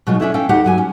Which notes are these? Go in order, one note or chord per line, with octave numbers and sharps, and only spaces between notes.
B2 F#3 G#3 D#4 F4
C#4 D4 E4 A4
C#4 A4 F5 G5
D#2 D#4 G4 F#5
G2 F#3 G#5
C#4